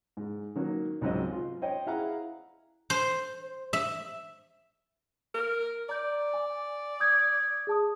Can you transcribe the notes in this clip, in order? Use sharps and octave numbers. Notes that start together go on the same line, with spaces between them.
G#2
D#3 F#3 A#3
C#2 G#2 F#3 C4 D#5
F4
C5 C#5 D#5 G5
E4 G#4 F5 F#5 A#5
C5
E5
A#4
D5 A#5 G6
G#5 D6
D#6 G6 G#6
G#4 A5 D#6